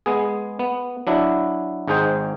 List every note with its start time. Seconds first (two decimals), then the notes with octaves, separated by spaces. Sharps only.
0.06 G#3 B3 G#4
0.59 B3
1.07 F#3 D4 E4
1.88 G#1 G#2 D#4 G#4 C5 G5